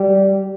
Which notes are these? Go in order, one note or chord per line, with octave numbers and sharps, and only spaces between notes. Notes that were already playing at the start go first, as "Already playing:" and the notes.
Already playing: G3